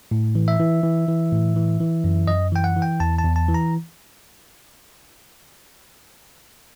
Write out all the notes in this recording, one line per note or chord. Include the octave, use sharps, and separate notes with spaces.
A2
E3
E5
E3
E3
E3
A2
E3
E3
F#2
F#2 D#5
E3 G5
F#5
E3
G5
E2 A5
A5
E2
A5
E3
A#5